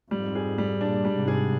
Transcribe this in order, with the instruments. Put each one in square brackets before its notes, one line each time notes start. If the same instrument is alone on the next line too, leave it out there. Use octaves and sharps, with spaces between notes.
[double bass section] F2 G#2 [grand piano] G3
[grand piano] G#4
G3
[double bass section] G2 A#2 [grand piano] D4
[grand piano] G3
[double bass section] G#2 C3
[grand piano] G#4